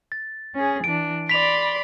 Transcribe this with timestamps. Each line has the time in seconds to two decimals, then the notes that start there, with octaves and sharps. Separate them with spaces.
0.12 A6
0.55 C#4 G#4
0.84 E3 D4 D7
1.29 D5 B5 C6 B6 F7